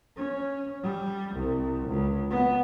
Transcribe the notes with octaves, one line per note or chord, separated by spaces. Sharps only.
C#4
G3
C2
C#2
B3